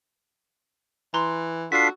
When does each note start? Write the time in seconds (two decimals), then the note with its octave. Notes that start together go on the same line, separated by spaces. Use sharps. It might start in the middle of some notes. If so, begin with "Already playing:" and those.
1.14 E3 A#5 C6
1.72 D4 F4 F#4 A4 B6 C7